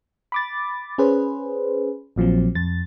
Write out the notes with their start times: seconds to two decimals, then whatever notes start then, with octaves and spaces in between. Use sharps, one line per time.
0.32 B5 D6 A6
0.98 C#4 G#4 B4 C5
2.16 A#1 A#2 F3 F#3 C4
2.55 F2 A6